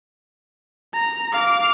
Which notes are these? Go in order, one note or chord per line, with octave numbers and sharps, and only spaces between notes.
A#5
F5 D6